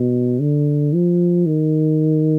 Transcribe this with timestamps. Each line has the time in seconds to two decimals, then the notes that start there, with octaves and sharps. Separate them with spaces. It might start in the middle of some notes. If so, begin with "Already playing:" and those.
Already playing: B2
0.40 D3
0.93 F3
1.46 D#3